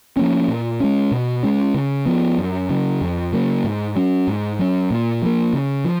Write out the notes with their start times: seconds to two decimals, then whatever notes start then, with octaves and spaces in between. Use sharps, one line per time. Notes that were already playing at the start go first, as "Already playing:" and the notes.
0.17 F3 A#3 C#4
0.48 A#2
0.80 G#3 C#4
1.12 B2
1.43 G#3 C#4
1.74 C#3
2.06 F3 B3
2.38 F#2
2.70 C#3 F#3
3.01 F2
3.33 C#3 F#3 A#3
3.64 G#2
3.96 F#3 C#4
4.27 G#2
4.59 F#3 C#4
4.91 A#2
5.22 F3 A#3
5.53 C#3
5.84 F3